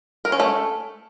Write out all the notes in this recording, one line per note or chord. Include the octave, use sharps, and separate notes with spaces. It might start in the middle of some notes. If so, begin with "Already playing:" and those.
A#4
C#4
A3